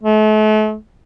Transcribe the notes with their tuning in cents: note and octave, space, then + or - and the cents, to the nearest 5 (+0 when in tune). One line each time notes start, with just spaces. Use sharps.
A3 -40